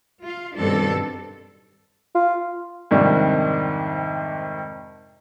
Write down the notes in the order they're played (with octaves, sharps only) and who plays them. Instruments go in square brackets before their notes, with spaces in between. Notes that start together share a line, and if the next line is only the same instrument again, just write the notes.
[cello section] F4 F5
G2 B2 D#3 C4 D4 A4
[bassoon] F4
[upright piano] F2 G#2 C3 D#3 G3 D4